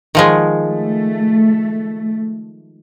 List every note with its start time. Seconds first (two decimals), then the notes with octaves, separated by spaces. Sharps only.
0.15 D#3 F3 G#3
0.65 A3